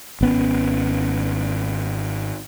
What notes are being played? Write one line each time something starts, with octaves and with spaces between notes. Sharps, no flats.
G#1 B3 C#4